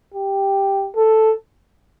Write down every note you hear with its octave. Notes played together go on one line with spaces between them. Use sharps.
G4
A4